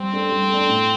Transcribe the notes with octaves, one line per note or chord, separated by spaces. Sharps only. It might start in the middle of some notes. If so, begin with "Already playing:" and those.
Already playing: G3 C4
D4 A4
G3
D4 A4
A2